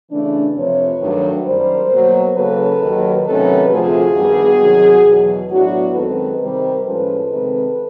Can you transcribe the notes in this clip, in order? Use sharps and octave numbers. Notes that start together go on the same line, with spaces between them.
C#3 E3 A3 D4
F2 C3 F3 B4 C#5
G2 D#3 F#3 A3 D4
F#2 D#3 G3 A#4 C5
B2 F#3 A#3
C#3 F#3 A#3 C#4 A4 B4
D#2 D#3 F#3
C3 D#3 F#3 A3 C#4 A4 B4
D2 C3 F3 A3 F#4 G#4
G2 D#3 G3 B3
C3 D#3 F#3
E2 B2 F#3
A2 F#3 B3 D4 E4 F#4
F#2 D#3 G#3 C4 A4 B4
C3 D#3 G3 C4 A#4 C5
A2 F3 G#3 C#4 A4 B4
C3 D#3 G#3 C4